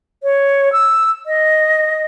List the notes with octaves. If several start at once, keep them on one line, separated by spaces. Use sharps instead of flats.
C#5
E6
D#5